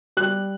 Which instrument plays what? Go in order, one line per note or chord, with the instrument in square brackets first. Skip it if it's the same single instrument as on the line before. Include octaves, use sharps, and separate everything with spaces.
[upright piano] G3 F#6